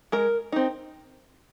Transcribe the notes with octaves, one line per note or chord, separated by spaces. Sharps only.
G#3 A#4
C4 D#4